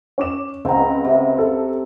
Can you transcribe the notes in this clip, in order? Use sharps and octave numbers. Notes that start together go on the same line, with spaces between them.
C#4 D6 E7
C#2 C4 F#5 A#5
C3
A4